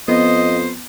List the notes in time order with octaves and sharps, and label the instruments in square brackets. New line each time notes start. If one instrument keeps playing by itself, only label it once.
[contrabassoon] F2 [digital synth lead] B3 [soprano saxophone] C5 [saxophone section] D#5